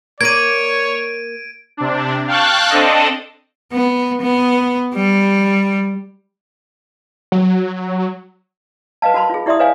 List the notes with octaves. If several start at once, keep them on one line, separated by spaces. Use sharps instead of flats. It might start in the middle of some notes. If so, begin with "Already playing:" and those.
A#3 C#5 D5 G#6 D7 D#7
C3 D4
F5 G5 A5 C#6 F#6
C4 D4 A4 D#5
B3
B3
G3
F#3
B4 D#5 F5 A5
F#4 A#4 A5 B5 C6
F4 G#4
E4 G4 D5 E5 C6 D#6
B4 C#5 D#5 F5 G#5